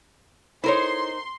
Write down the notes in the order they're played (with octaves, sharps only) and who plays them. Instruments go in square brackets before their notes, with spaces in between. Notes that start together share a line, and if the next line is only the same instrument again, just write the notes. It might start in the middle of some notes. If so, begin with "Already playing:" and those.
[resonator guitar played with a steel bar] D#4 A#4 C5 [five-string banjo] E4 A4 C#5 [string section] C6